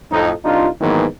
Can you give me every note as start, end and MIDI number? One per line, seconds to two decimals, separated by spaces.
0.12 0.33 41
0.12 0.33 45
0.12 0.33 63
0.45 0.67 36
0.45 0.67 62
0.45 0.67 63
0.45 0.67 65
0.81 1.05 44
0.81 1.05 51
0.81 1.05 52
0.81 1.05 54
0.81 1.05 58
0.81 1.05 59